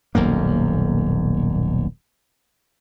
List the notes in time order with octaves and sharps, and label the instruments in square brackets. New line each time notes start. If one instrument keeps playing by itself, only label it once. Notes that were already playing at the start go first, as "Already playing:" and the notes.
[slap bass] D#1 B1 F#2 A#3